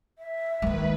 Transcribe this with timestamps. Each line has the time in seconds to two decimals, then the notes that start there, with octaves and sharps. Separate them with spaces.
0.19 E5
0.62 D#3 G#3 A#3 B4